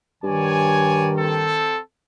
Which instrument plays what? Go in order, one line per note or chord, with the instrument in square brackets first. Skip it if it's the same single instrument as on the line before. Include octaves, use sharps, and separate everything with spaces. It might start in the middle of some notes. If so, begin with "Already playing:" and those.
[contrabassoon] G2 [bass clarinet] D#3 [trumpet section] C#5 D5 G#5
[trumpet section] C4 A4